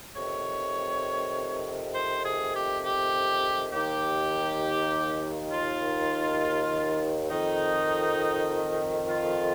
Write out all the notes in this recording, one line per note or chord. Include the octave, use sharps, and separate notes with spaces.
F2 C3 D#3 C#5
C5
G#4
G4
G4
D#2 D#3 G4
F4
F2 D#3 D#4
F4